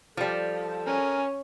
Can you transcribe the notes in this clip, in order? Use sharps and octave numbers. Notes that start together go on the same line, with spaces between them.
F3 G3 A4
C#4 A#4 G#5